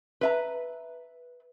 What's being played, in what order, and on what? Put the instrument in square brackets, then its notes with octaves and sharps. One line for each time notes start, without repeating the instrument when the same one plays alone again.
[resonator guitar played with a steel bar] B4 E5 A#5